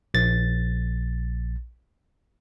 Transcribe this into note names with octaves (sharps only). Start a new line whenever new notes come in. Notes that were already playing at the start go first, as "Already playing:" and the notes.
A#1 A6